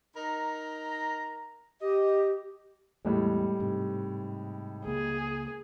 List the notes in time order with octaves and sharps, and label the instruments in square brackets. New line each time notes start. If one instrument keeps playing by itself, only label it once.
[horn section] D#4 A#4 A#5
[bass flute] G4 [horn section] D#5
[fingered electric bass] E2 [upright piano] A2 G3 G#3
[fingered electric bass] G#2 C3
[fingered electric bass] C#2 A#3 [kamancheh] G#4